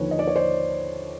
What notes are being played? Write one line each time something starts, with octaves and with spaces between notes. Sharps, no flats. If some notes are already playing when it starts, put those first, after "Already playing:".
Already playing: D#2 D3 F3 B4 C#5
D#5
D5
C#5
C5 D5